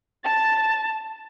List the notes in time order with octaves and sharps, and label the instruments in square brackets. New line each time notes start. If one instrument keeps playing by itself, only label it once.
[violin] A5 A6